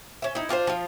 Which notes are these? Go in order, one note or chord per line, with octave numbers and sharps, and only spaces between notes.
C#4 E5
D#4 E4
D4 F4 G4 C5
F3 F4